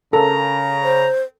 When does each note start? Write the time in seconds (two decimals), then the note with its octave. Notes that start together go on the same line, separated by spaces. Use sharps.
0.13 C#3 A4 A#4 A#5
0.83 C5